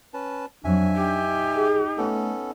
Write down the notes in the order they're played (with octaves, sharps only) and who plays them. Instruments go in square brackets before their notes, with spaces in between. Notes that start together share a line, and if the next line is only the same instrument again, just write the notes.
[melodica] C#4 B4 A5
[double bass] F2 F#3 [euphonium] D4 [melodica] E5 G#5
[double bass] D#4 [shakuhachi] G4
[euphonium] G#4
[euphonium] A3 [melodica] B3 C#4 A4